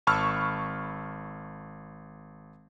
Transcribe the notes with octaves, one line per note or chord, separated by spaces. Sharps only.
G#1 A5 B5 C#6 E6 F6